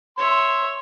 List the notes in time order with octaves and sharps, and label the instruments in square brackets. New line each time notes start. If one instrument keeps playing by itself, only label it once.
[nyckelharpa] C#5 E5 [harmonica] C6